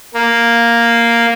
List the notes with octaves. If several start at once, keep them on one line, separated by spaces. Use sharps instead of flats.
A#3